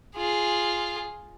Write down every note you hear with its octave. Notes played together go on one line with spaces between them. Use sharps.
F4 G#4